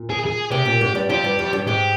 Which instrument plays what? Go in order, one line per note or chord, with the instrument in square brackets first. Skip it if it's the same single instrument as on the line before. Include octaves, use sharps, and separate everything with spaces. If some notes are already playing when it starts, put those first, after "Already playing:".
Already playing: [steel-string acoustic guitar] A#2
[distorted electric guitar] G#4
G#4
[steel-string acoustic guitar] C3 C4 [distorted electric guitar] G4
[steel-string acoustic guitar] A#2 A#3
G#2 G#3
G2 G3
[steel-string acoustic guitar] F2 F3 [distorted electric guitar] G4
[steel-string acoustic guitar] G2 G3
F2 F3
G2 G3
[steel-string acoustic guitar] G#2 G#3 [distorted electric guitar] G4